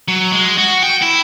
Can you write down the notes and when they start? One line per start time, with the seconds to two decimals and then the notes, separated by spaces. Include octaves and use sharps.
0.08 F#3
0.32 G#3
0.58 F#4
0.83 G5
1.03 E4